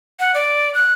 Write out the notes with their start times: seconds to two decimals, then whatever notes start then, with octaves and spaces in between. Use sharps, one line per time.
0.20 F#5
0.34 D5
0.75 F#6